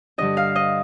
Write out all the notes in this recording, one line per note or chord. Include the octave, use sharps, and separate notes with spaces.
G2 D3 G3 D4 D#5
F5
D#5